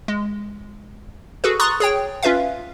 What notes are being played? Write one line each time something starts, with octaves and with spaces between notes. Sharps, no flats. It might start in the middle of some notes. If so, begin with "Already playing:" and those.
G#3
F#4 G#4 A4 B4
A#5 C6 C#6 D#6 F#6 A6
G#4 C#5 G5
C#4 F4 B4 E5 F5